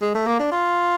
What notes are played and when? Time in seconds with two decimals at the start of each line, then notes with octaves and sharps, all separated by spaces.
0.02 G#3
0.15 A3
0.26 A#3
0.39 D4
0.51 F4